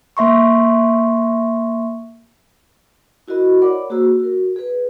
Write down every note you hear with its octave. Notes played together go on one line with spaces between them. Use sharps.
A#3 E5 C6 C#6
E4 F#4 A#4 D#5 B5
A#4 C#5 D5 F#5 B5 D6
A#3 F#4 G#4 C5 E6
F#4 A#4
G#4 B4